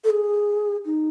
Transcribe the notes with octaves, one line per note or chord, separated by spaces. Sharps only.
A4
G#4
D#4